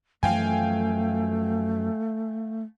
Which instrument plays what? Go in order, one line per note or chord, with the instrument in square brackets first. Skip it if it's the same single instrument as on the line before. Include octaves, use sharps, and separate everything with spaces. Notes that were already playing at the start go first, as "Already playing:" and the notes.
[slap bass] F#2 E3 F3 [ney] A3 [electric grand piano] F5 G5 G#5